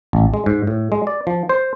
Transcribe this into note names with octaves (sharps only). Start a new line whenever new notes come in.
A1
G#3
G#2
A2
G#3
D5
F3
C5